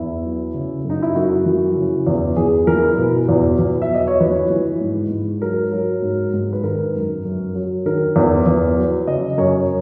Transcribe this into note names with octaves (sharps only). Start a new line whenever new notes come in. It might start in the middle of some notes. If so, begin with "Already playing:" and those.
Already playing: E2 E4
F#3
C#3
F#2
D#4
E4
F#2 F#4
E3
C#3
E2
E2 G#4
E3 A#4
B2 B4
E2
E2
E5
F#3
D#5
C#5
E3 B4
E3
G#2
G#2
F#3 A#4
F#3
G#2
G#2
B4
D#3 A#4
F#2
F#2
F#3
D#3 A#4
E2
E2
F#3
C#3 D#5
F#2 C#5